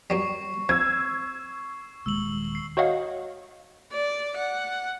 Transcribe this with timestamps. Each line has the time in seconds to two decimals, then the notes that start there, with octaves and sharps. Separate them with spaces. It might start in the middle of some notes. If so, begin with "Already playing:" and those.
0.10 F#2 F#3 G3 C#6 C7
0.69 F3 C4 E6 G#6
2.06 D#1 D#2 G#3 E6 F#7
2.55 C7
2.77 F#4 C#5 D#5 F5 F#5
3.92 D5
4.36 F#5